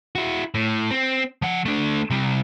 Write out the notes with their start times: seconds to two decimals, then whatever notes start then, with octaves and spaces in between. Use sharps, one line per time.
0.15 E4 F#4
0.55 A2
0.91 C4
1.42 F3 F#5
1.66 A3 D4
2.10 C3 G3